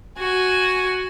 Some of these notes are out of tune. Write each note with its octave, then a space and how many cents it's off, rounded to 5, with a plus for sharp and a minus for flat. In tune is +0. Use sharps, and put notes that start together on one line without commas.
F#4 +0 G#5 +0